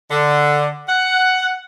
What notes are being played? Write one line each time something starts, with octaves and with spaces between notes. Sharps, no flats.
D3
F#5